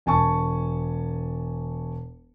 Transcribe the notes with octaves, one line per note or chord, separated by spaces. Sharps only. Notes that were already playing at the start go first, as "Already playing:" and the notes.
E1 G#5 A5 C#6